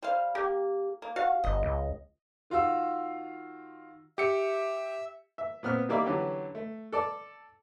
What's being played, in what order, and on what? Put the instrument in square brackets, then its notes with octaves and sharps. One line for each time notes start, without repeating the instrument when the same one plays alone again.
[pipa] G3 C5 F5
[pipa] A#3 [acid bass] G4
[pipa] A#3
[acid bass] F#4 [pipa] F5
[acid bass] G1 [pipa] D#5
[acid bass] C#2
[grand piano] D#3 F4 F#4 F5 E6
[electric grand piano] G4 C#7 [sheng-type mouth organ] E5
[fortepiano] E5
A#2 B3 C4 F6
D#3 G3 A#3 D5 E5 B5
D3 E3 F#3 C#4 G4
A3
A4 D5 A5